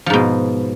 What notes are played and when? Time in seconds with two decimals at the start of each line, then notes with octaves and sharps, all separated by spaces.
0.06 F3
0.10 G#2
0.13 B2